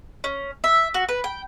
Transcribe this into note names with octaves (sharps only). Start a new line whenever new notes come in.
C#4
E5
F#4
B4
G5